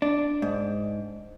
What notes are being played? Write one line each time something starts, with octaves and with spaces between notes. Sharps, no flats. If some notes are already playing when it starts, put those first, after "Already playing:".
D4
G#2